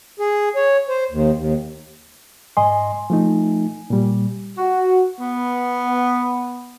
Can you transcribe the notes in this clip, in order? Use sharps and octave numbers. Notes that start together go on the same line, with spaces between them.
G#4
C#5
C5
D#2
D#2
G#2 D#5 G#5 C6
F3 A3 D#4
A#2 G3
F#4
B3